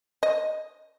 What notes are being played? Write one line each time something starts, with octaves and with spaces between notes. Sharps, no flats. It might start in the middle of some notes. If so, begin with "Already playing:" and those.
D#5